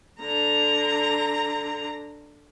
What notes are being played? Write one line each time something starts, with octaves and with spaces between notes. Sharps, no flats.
D3 A#5